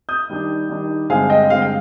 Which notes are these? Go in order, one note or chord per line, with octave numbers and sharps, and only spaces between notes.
D#6 G6
D#3 G3 D4
D#3 G3 D4
G2 D3 G#3 C4 F5 G#5
D#5 G5
G2 D3 G#3 C4 F5
G5